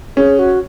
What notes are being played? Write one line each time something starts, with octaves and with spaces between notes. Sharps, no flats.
C#4 G#4
F#4